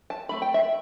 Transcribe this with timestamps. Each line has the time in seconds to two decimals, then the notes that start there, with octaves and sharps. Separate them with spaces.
0.10 A5
0.29 F3 A3 C4 B5
0.42 G5
0.54 E5